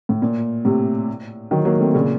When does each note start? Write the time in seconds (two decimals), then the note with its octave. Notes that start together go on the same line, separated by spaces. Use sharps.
0.09 A2
0.22 A#2
0.65 A2 C3
1.51 D#3 F#3
1.65 F#3 A#3
1.80 A3 C4
1.94 A#2 C#3